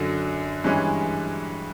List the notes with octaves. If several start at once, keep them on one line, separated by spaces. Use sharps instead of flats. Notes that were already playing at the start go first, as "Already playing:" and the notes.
Already playing: F#2 D3 F#3
G2 E3 G#3 C#4